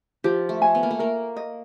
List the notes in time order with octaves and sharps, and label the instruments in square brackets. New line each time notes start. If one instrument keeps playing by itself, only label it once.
[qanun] F3 [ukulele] G4
[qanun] A3
[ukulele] G#5
[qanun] B3
A#3
A3
[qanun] A#3 [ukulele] A#4
[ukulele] D#5